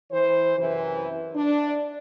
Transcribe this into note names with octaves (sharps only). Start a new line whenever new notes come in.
E3 C5
F#2 C3 E3
D4